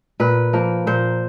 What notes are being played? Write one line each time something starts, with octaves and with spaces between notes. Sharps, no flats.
A#2 B4
F3 A#3
A#2 C5